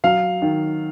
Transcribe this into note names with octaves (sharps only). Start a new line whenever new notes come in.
F#3 F5
D#3